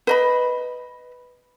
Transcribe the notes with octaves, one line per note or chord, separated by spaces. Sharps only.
B4 D#5 B5